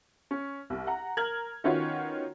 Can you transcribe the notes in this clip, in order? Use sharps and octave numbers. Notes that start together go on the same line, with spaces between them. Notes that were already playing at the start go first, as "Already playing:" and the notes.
C#4
C2
F#5 A#5
A#4 A#5 F6 G#6 F#7
D#3 B3 C#4 F4 F#4 C#5